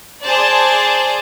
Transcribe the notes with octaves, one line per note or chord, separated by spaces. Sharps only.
G#4 C5 D5 A5